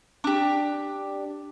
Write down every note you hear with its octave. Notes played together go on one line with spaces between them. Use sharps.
D4 G4